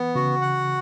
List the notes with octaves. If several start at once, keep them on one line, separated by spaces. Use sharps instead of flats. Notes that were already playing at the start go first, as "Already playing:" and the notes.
Already playing: E3 B3
C#3 F#4
F#5